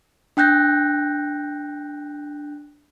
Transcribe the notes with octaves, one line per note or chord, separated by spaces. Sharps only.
D4 G5 F#6 G6 A#6